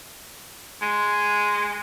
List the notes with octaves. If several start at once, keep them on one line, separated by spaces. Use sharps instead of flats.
G#3